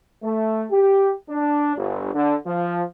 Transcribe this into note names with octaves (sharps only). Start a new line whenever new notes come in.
A3
G4
D4
G1
D3
F3